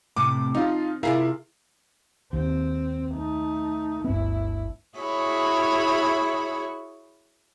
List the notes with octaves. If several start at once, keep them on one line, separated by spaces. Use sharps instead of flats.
A2 C3 D6
F3 D#4 F4
C3 E4 F4 G#4 A#4 F5
D#2 C4
A3 D#4
G1 D2 B3 E4
E4 F#4 G#4 C#5 B5